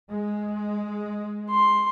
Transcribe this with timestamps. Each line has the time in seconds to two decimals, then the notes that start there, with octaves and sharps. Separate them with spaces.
0.10 G#3
1.50 C6